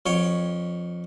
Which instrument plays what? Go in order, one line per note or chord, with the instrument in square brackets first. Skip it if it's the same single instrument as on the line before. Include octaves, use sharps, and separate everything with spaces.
[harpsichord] F2 C#5 G5